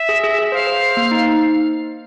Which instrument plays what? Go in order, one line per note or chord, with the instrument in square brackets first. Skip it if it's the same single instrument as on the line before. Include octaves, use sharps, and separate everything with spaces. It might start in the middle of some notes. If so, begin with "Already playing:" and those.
Already playing: [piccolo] E5
[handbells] G#4
G#4
G#4
[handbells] C5 [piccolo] F5
[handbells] C5
C5
A#3
D#4